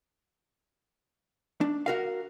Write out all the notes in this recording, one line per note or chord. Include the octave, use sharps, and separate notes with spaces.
D4
F#4 A#4 F5